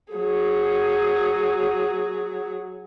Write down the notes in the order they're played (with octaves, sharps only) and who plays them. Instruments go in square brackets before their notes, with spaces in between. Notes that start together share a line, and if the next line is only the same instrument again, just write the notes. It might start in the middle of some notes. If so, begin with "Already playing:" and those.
[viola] F#3 G#4